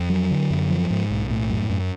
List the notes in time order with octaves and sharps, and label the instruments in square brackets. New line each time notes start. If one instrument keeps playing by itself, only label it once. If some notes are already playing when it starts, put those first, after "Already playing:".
Already playing: [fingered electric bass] F2
F#3
D3
F#2
F3
G#2
B1
A2
F#2
F#2